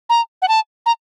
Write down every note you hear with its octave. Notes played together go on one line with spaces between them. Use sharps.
A#5
F#5
A5
A#5